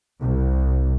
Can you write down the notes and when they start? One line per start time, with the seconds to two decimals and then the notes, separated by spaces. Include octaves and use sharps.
0.19 C2